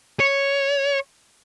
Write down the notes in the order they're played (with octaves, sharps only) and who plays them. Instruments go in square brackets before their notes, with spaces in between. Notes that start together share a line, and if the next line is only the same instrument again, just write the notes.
[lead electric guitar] C#5